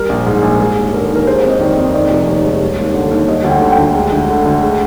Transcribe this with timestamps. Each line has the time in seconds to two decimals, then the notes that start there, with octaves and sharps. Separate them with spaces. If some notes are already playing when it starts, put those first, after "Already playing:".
Already playing: G3 A#4
0.09 A#1
0.26 G#2 G#4
0.42 A#1
0.60 G#3 G#4
0.76 D#2
0.93 D3 A#4
1.11 D#2
1.16 A#4
1.26 G#3 C5
1.44 F2
1.49 D#5
1.61 D#3 D5
1.77 F2
1.94 D#3 D5
2.11 F1
2.27 D#2
2.44 G#3
2.61 G3
2.78 D#2
2.94 D3
3.11 D#2
3.27 G3 D#5
3.44 D2
3.50 G5
3.62 D3
3.72 G5
3.78 D2
3.95 G#3
4.12 D2
4.29 D3
4.46 D2
4.62 G#3